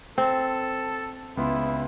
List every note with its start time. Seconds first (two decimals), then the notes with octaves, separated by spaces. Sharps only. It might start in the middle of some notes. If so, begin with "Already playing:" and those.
0.18 C4 A4
1.37 C#2 B3 E4 C6